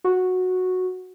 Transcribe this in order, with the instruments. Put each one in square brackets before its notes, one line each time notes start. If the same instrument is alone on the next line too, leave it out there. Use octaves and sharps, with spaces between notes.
[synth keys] F#4